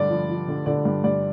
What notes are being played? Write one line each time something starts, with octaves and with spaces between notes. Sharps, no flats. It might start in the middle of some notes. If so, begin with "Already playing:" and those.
Already playing: G2 D3 D5
F3
F3
D3
D3 D5
G2
G2 D5